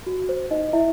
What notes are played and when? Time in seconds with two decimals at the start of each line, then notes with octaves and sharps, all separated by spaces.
0.06 F#4
0.29 C5
0.51 D#4 D#5
0.73 E4 E5